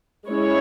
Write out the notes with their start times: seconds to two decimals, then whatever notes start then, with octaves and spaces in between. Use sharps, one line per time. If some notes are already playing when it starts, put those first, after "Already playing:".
0.29 G#3 C#4 E4 C#5